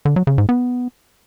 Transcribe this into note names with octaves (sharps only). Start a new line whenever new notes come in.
D3
F#3
C#3
G#2
B3